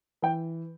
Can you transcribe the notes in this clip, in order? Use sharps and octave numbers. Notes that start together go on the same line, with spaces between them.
E3 G5